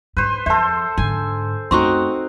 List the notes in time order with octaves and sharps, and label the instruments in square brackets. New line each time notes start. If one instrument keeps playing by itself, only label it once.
[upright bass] G#2 [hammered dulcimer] B4 C5
[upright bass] F2 [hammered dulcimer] A4 C5 [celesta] E5 A5
[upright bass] G#2 D3 [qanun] G#5
[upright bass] F#2 A3 [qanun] C4 D#4 F#4 [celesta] C6 C#6